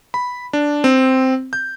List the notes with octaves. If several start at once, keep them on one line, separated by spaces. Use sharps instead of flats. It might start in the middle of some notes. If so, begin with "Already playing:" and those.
B5
D4
C4
G6